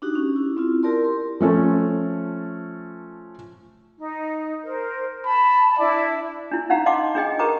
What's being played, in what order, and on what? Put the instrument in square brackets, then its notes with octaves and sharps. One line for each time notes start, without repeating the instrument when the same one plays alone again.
[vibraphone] D4 D#4 F#4 G4
C#4
E4
C4 E4 F4
E4 G4 A#4 D5 A5 C6
C6
[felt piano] F3 A3 C#4 A4
[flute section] D#4
A#4 C5
[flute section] A5 [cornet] B5
[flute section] D4 E4 E5 [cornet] D5
[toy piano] D4 E4
C#4 D#4 F5 F#5 A#5
D#5 F5 F#5 A5 C6 D6
D4 G#4 D#5 G5
G4 A#4 B4 A#5 D6